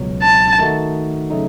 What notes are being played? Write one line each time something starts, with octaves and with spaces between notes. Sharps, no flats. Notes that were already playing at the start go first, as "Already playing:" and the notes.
Already playing: C#2 B2 F#3
A5
D#3 A3 D#4 F#4
C#3 F#3 A3 D#4